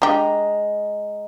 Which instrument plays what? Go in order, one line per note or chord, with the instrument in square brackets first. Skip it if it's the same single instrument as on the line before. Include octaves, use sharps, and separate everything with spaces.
[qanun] G#3 [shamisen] D4 G4 [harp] A#5